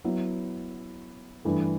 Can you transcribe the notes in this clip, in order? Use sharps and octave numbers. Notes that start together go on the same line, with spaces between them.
F#3 B3 E4
G2 E3 A3